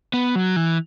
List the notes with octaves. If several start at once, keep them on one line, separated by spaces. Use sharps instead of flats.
B3
F#3
E3